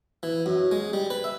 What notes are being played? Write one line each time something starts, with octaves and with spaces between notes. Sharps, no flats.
E3
F#2
G#3
G3
B4
E5